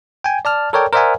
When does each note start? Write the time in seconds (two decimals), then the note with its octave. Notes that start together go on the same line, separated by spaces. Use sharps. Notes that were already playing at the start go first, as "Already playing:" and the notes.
0.24 G5 G#5
0.45 D5 A5 F6
0.73 A4 A#4 C#5 D5 G5
0.93 A#4 C5 D5 E5 F#5 G#5